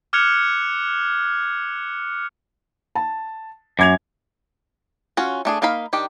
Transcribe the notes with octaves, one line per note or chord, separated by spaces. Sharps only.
D6 F6 F#6 G#6 C#7 F7
A5
F#2 D6 G#6 F7
C#4 F4 F#4
A3 D4 G#4
A#3 D#4 F5 B5
D#3 D4 G4